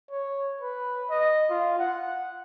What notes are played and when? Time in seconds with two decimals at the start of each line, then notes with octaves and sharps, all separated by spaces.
0.11 C#5
0.62 B4
1.10 D#5
1.50 F4
1.79 F#5